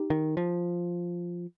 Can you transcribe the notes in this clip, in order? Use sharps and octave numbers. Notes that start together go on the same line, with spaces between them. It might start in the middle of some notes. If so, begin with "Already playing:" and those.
Already playing: D#4 G4
D#3
F3